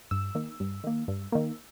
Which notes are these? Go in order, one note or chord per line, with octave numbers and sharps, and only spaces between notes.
G2 E6
D#3 A#3
G2
D#3 A#3
G2
D#3 A#3